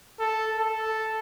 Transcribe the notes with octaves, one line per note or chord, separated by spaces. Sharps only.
A4
A4